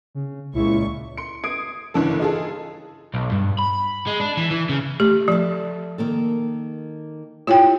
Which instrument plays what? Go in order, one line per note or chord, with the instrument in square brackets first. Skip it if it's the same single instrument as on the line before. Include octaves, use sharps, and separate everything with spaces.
[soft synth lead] C#3
[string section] C#2 A#2 C#6 [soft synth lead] E4
[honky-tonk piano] C6 C#7
D#6 G#6 C7 D7
F#1 G2 D3 E3 D4 A4
D#4 F4 G#4 A4
[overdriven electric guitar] B1
G2
B5
G#3
D4
E3
E3
C#3
[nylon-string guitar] A3 [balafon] G4
[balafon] F3 [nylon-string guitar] A4 E5
[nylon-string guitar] D#3 A#3 A4
[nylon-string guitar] E4 G4 C#5 [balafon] F4 G5